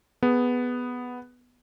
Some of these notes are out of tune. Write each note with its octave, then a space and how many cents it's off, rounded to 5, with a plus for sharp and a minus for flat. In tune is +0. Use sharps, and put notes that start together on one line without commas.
B3 +0 G#4 +0